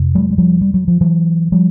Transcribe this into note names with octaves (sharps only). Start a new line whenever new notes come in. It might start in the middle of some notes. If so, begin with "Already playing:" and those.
Already playing: F2 C3
F#3 G#3
G#3
F3 G3
G3
F#3
F3
E3 F#3
F3 G3